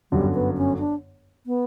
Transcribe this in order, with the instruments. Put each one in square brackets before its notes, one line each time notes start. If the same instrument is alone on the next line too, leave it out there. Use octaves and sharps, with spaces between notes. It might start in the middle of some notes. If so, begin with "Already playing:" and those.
[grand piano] G1 F#2 D3 F#3 [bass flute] G3
[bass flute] B3
C#4
D4
B3